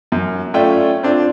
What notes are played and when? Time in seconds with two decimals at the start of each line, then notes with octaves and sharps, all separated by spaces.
0.12 F#2
0.54 A3 C#4 F4 D5 E5 G5
1.03 C4 D4 F4